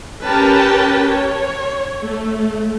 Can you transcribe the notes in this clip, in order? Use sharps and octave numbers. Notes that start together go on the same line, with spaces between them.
C#4 G4 A#4 B4 G5 A5
C#5
A3